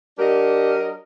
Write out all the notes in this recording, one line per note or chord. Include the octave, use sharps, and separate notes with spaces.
F#3 D4 G4 A#4 D#5